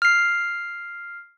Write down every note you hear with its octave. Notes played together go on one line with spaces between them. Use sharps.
F6 C7